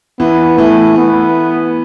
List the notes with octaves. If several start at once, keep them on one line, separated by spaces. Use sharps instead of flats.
E3 B3
E3 A3
B3